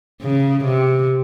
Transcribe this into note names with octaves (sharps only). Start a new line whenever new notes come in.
C#3
C3